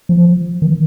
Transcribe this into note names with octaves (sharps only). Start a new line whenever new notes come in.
F3
D#3